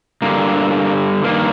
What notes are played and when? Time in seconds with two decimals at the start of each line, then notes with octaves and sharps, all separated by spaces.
0.22 G2 D3 A#3
1.24 G2 D#3 A#3